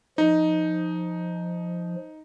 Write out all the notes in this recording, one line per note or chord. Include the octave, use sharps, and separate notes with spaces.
F3 D#4